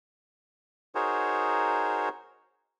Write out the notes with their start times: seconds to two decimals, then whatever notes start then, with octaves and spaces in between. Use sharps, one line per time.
0.95 D#4 F#4 G#4 A#4 C5 C#5